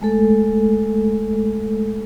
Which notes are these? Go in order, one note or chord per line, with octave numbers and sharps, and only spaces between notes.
G#3 A3 A4